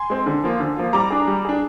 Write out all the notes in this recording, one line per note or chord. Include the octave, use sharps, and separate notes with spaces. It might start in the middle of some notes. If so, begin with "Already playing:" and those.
Already playing: G#5 C6
G#3 C4
D3
F3 A#3 F4
D3
F3 A#3 F4
G3 A#5 D6
D4 G#4
G3
D4 G#4